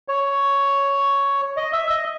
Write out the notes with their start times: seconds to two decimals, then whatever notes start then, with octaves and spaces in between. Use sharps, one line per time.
0.08 C#5
1.57 D#5
1.73 E5
1.89 D#5